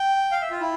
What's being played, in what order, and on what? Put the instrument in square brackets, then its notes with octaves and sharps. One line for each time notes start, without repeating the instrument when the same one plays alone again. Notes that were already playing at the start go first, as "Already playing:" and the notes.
Already playing: [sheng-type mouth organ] G5
F5
E5
F4
E4